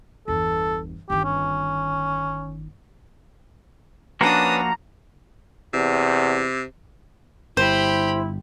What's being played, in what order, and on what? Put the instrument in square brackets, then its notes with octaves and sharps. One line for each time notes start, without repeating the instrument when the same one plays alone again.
[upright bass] G1 E2 [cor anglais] A4
[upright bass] G1 D#3 [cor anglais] G4
[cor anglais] C#4
[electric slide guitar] F3 A#3 F#4 [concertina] C#4 B4 [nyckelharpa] D4 D#6 [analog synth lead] A#5
[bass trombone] E2 [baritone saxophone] C3
[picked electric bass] G1 [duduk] E4 [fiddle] G4 B5 [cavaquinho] C5